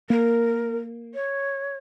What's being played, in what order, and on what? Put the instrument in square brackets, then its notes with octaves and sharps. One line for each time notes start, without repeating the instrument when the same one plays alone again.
[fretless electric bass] A#3 [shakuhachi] A#4
[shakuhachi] C#5